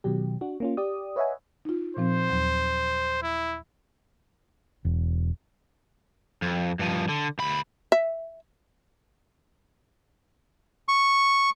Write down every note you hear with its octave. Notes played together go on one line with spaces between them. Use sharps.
B2 D#3 F#3 G4
D4 F#4
A#3 C#4 F4
G4 D5 D#6
B4 C#5 D#5 E5 F#5 G#5
D#4 F4
A#2 F3 C4 C5
D#2 F#3
E4
E1
F2
G2 F3
D3
D2 B5
E5
C#6